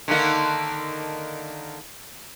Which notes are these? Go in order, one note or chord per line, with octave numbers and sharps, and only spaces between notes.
D3 D#3 A#3